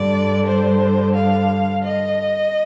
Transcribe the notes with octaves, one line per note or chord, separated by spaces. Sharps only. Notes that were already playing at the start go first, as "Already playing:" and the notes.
Already playing: G2 D3 D5
C5
F5
D#5